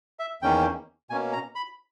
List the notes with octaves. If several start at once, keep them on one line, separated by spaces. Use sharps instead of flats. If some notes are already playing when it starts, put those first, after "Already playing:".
E5
E2 D#3 A#3 C#4 G5
B2 A#3 C#4 G#5
A#5
B5